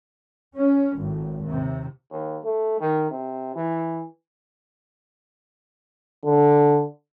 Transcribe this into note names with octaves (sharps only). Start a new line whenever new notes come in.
C#4
G#1 A2
D#2 C3
D#2
A3
D#3
C3
E3
D3